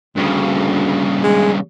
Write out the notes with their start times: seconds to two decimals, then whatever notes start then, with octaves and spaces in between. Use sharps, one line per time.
0.16 D2 G2 C#3
1.24 G#3